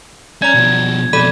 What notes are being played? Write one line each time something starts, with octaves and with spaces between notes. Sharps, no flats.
C#4 D5 A#5 G#6
B2 F3
F2 B2 A4 D5 B5